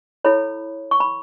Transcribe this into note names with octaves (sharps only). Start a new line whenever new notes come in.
E4 A4 C#5 B5
C#6
B5